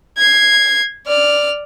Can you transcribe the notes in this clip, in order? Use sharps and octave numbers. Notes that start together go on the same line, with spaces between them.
G#6 C7
D5 F6